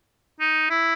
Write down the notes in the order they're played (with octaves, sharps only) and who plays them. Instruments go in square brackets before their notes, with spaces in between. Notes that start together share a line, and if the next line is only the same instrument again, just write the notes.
[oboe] D#4
E4